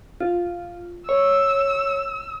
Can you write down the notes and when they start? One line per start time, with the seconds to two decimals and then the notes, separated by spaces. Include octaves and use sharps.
0.21 F4
1.09 C#5 E6